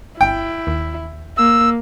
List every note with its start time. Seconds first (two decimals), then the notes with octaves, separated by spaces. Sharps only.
0.21 G1 E4 G5
0.67 D#2
1.38 A#3 E6